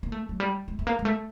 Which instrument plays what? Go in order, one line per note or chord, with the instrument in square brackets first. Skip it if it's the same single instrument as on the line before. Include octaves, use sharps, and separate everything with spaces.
[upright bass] A#3
A3
F#3
G3
G#3
A3
A#3
G#3
A3